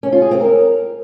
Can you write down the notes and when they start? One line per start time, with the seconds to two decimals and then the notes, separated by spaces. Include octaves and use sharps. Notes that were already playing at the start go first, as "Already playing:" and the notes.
0.03 C#4
0.12 F4
0.22 G#4
0.31 C4
0.41 A#4